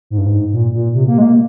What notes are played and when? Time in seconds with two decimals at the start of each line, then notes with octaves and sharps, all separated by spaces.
0.10 G#2
0.18 G2
0.26 G#2
0.52 A#2
0.74 A#2
0.94 C3
1.08 A#3
1.18 G#3
1.22 A#3